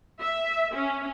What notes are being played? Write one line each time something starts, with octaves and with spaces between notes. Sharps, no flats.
E5
C#4